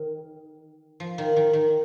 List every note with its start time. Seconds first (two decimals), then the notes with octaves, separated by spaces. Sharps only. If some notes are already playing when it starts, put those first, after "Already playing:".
Already playing: D#3
1.00 F3
1.18 D#3
1.36 D#3
1.53 D#3